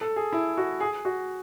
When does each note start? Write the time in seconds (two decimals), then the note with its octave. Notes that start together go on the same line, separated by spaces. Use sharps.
0.01 A4
0.16 G#4
0.33 E4
0.57 F#4
0.80 G#4
1.05 F#4